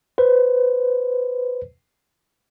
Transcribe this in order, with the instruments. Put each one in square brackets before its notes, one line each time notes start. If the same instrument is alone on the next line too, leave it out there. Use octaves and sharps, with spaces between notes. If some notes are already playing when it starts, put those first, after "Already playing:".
[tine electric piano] B4 C5